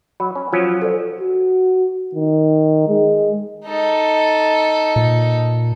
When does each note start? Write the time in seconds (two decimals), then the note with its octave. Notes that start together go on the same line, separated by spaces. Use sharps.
0.20 F#3 B5
0.35 C#4
0.53 F3 F#3 C#4 F4
0.82 A4 C5 D5
1.21 F#4
2.15 D#3
2.88 G#3
3.66 D#4 A4
4.96 A#2